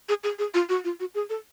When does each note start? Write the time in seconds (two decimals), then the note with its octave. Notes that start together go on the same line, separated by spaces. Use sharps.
0.09 G#4
0.24 G#4
0.39 G#4
0.54 F4
0.69 F#4
0.84 F4
1.00 F#4
1.15 G#4
1.30 A4